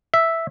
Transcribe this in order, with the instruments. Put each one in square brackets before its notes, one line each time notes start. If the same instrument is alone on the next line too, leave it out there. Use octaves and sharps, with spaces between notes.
[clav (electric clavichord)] E5